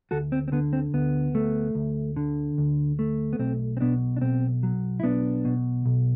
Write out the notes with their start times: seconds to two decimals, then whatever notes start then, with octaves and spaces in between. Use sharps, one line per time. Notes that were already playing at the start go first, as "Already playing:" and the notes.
0.11 D2 F#4 A4
0.32 C4
0.48 C4
0.52 D3 B3
0.73 C4
0.94 D2 B3
1.35 A3
1.75 D2
2.16 D3
2.58 D2
2.99 A3
3.33 B3
3.39 B1 C4
3.77 C4
3.80 B2 B3 D4
4.17 D4
4.21 B1 C4
4.63 F#3
5.00 E4
5.03 B1 B3 D4
5.45 B2
5.86 B1